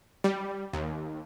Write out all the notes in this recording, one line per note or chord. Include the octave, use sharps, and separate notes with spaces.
G3
D#2